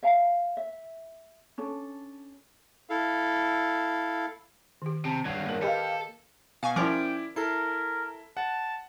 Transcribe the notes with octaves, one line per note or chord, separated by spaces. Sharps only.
E5 F5 G#5 A#5
E5
C#4 D4 A4
E4 A4 F5
D#3 G4
C3 A5
G2 F#3 G#6 C7
A#3 A#4
G4 A4 B4 D#5 F5
B2 F5 G#5 C#6
F3 C#4 E4 A#4 D5 G5 D6
E4 A4 A#4 C7
F#5 A5